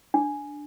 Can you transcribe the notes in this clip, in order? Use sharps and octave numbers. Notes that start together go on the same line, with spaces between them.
D4